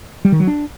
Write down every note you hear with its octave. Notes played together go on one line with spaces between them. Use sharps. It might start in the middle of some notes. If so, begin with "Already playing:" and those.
G3
D#3
F#3
D4